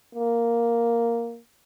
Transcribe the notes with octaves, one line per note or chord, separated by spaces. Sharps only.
A#3